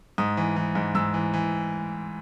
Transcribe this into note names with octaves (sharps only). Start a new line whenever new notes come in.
G#2 D#6
E3
E3
G#2
G#2 E6
E3
E3